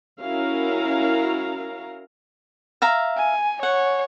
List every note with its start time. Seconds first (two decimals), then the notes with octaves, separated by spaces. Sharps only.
0.22 C#4 E4 F#4 A#4 F5 A#5
2.82 E5 F5 A#5
3.17 G#5
3.63 C#5 F#5